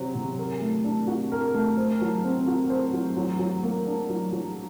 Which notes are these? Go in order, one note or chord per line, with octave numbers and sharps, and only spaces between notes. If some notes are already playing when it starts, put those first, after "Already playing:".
Already playing: C3 F#3 C4 F#4
C3
A#4
A3
D4
F#4
A#4
A3
C5
F#3
C4
F#4
C5
F#3
F#3
F#3
A#3
D4
F#3
F#3